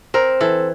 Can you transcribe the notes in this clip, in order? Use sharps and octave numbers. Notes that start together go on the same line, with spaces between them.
C4 A#4
E3 A4